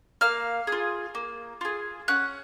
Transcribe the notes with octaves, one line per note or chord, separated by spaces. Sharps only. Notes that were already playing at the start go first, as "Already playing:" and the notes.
A#3 F5 F6
F4 G#4
A#3
F4 G#4
C#4 F#5 F#6